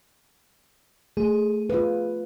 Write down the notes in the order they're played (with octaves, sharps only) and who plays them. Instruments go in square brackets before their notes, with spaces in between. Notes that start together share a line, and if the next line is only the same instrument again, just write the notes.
[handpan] A3 [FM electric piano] G#4
[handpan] F4 B4